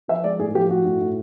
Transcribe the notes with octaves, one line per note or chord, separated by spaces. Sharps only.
F3 E5
G#3 D5
A2 G#4
F3 G4
A2 F#4
A2
A2